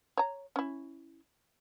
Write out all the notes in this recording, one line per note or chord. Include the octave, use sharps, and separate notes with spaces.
C#5 A#5
C#4 E4